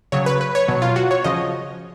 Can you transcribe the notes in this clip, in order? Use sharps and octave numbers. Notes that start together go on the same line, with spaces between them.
C#3 F#3 C#5
B4
B4
C#5
B2 F#3
F4
F#4
C#5
C#3 F3 D#5